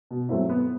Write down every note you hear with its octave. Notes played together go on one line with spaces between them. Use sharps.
B2
F#3 A3 C4 E4
B3